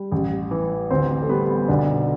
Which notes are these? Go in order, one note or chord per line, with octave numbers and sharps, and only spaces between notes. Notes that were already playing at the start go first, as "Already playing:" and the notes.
Already playing: G3
A1
E3
D2 C4 C5
A4
G3 B3 B4
B1 D3 D4